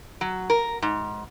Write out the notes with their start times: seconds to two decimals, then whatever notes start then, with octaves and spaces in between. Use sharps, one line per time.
0.21 F#3
0.50 A#4
0.82 G#2